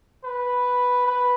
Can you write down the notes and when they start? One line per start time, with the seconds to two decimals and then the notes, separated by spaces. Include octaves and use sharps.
0.25 B4
1.07 B4